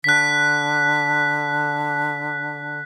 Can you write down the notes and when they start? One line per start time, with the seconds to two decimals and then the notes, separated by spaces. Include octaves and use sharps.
0.04 D3 F#6 B6